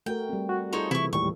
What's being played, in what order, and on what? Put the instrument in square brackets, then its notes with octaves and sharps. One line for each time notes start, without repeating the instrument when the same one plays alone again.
[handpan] A3 F#4 A#4 [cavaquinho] G5
[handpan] G3 C4
[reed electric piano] F#4
[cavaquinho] D#4 C5 C#5 [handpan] F4 G#4 A4
[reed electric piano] C3 [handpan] E3 [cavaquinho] E4 C#6
[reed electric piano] D#2 A2 G3 [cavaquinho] C#6